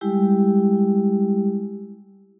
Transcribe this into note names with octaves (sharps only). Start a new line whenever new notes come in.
G3 G#3 E4 G4